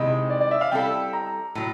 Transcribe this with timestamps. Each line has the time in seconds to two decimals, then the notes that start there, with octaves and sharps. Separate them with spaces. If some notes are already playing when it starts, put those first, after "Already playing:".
Already playing: C3 D#3 G#3 C4 E4 D#5
0.30 D5
0.41 D5
0.51 E5
0.61 F5
0.71 G3 C4 E4 A4 G5
1.13 A#5
1.55 A2 F#3